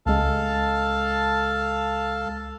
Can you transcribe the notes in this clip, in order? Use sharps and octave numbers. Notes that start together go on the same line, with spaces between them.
C#2 G#3 A4 F5 A5